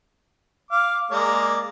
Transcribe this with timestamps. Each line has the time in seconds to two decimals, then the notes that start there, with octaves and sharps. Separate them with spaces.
0.71 F5 D6
1.11 G#3 A#3 D5